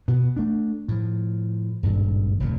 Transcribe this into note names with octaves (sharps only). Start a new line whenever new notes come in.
B2 B3
A3 D4
A2 F3
D#1 G#1 G2
F1 D2 A#2